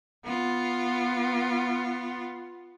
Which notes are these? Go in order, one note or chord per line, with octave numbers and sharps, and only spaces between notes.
B3 F4